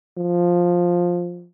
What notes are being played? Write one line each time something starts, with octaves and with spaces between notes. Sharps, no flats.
F3